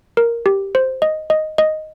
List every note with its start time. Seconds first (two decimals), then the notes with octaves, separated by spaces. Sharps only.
0.17 A#4
0.46 G4
0.75 C5
1.02 D#5
1.30 D#5
1.58 D#5